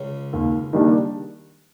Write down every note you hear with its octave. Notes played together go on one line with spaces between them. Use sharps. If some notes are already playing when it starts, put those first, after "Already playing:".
Already playing: C#2 C#3
D#2
D#3 G3 A#3 D4